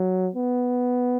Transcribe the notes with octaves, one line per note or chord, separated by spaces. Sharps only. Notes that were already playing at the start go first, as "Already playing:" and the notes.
Already playing: F#3
B3